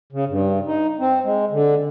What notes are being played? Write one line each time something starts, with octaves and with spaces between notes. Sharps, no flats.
C#3
G2
D#4
C4
G#3
D3